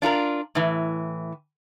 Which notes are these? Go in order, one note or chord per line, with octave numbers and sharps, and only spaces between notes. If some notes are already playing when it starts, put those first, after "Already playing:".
D4 F4 A4 A#4
A2 E3